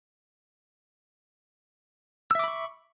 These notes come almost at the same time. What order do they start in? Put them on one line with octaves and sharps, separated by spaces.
E6 E5 D6 B5 C#6